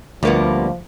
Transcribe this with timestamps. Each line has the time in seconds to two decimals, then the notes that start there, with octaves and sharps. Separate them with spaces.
0.23 D2 F3 G3 A#3 B3